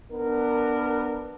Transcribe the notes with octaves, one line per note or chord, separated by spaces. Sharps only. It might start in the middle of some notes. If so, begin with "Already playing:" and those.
B3 D4 A#4